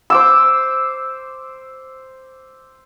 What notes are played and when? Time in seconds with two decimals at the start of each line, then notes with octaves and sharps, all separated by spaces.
0.10 C5 D6 E6